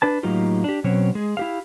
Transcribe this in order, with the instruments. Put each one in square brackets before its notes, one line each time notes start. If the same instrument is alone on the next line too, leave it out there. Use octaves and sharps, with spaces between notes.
[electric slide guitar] D4 B4 A5
A2 F#3 A#3 D#4 F4 G4
D4 G4
B2 F#3 C4 C#4 C#5
G#3 G#4
E4 G4 F5